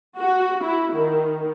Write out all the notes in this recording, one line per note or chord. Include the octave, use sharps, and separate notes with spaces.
F#4
E4
D#3